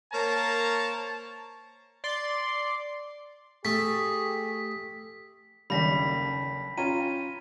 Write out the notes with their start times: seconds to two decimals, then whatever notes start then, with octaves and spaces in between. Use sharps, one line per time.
0.13 A#3 A#4 C5 C#5 A5 A#5
2.04 D5 C6
3.65 A3 G4 G#4 B6
5.70 F#1 D#2 D3 G3 B5 A#6 B6
6.78 C#4 F4 G5 A#5 D#7